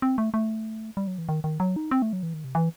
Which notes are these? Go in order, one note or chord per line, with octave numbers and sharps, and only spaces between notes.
C4
A3
A3
G3
F#3
E3
D#3
D#3
F#3
D#4
C4
A3
F#3
E3
D#3
C3
E3